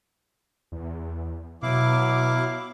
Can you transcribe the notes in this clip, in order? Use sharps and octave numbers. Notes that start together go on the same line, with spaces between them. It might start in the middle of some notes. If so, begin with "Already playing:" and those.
E2
B2 F#3 E4 F5 D6